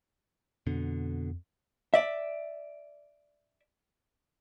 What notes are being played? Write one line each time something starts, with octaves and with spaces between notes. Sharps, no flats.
F2 B2 D3
D5 E5